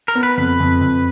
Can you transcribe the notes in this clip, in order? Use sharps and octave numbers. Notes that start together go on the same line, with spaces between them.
A#4
B3
B4
F2 B4
F2
F2